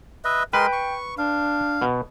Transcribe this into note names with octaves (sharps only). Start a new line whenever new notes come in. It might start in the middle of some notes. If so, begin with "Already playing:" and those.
B4 D#5 E5
G#3 A#4 B4 G5 C6
C#6
D4 F5
B2